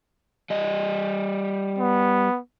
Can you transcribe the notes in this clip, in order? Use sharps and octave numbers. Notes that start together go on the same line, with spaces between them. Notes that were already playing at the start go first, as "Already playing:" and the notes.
G3 D#5
B3